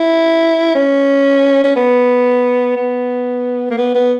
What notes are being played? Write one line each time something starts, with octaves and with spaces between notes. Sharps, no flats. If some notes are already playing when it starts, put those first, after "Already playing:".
Already playing: E4
C#4
C#4
B3
B3
A#3
B3
B3